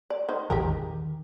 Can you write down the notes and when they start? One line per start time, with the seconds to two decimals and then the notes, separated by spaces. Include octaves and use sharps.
0.10 D5
0.29 D#3 C5
0.50 E1 A#1 E2 G4 G#4 A#4
0.68 D#3